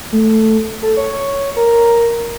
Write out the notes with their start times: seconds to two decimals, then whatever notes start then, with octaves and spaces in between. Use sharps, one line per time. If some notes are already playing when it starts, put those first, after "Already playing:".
0.12 A3
0.82 A4
0.97 C#5
1.56 A#4